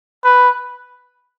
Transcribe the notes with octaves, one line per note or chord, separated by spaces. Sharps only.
B4